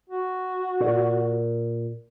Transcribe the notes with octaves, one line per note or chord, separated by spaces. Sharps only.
F#4
A#2